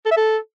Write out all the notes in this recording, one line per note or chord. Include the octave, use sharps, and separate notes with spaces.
A4
E5
A4